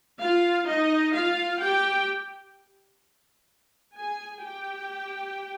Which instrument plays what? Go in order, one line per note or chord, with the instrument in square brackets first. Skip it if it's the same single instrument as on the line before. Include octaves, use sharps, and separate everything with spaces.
[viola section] F4 F5
D#4 D#5
F4 F5
G4 G5
G#4 G#5
G4 G5